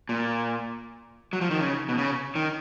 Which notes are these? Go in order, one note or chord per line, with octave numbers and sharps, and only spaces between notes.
A#2
F#3
F3
D#3
C#3
B2
C#3
D#3